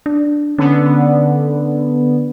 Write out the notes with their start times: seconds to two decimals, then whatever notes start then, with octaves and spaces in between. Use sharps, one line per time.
0.06 D4
0.58 D3 B3 C#4